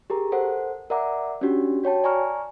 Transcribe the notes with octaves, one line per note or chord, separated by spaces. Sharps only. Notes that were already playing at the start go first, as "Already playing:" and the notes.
G4 G#4 A#4 A#5
A4 A#4 C5 F#5
A#4 D5 E5 F#5 A#5 D6
C#4 D4 E4 F#4 G4
F#4 C#5 G5 A5
D5 G#5 A#5 C#6 F6